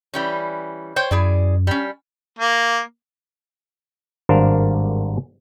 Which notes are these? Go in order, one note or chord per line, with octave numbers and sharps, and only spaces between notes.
E3 G3 C#4
C5 C#5 G5
F#2 E4 G#4 D5
G3 C#4
A#3
G#1 G2 D4 A#4 C5 F5